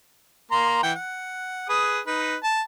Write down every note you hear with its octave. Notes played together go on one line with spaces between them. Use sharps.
A#3 A#5 C6
E3 F#5 G5
F#5
G#4 B4 D#6
D#4 B4
A5